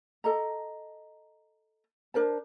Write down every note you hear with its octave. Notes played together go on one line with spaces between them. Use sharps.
A4 D#5 A#5
D4 A#4 C5 A5